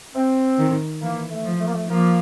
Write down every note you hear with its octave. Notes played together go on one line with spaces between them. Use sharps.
C4
D#3
E3 A#3
A3
F3
A3
A#3
A3
F3 A#3